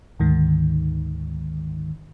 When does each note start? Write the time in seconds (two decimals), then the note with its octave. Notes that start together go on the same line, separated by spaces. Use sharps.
0.19 D2 G#2 D#3